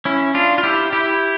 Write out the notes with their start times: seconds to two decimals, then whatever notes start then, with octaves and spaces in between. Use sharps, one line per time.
0.05 C#4 E4
0.35 D4 F4
0.58 F4
0.63 E4 G4
0.93 E4 G4